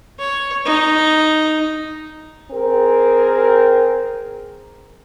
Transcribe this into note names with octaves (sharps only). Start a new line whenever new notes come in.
C#5
D#4
C4 G#4 A#4